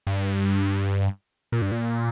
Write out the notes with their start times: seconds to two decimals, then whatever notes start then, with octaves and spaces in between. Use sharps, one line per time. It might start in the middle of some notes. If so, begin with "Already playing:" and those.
0.07 G2
1.52 A#2
1.62 G2
1.72 A#2